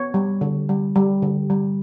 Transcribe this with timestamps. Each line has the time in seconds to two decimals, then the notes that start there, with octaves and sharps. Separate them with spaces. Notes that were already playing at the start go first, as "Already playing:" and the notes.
Already playing: B3 C#5
0.14 G3
0.41 D3
0.69 G3
0.96 G3
1.22 D3
1.50 G3